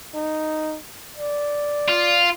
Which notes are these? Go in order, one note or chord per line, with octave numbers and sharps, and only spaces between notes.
D#4
D5
F4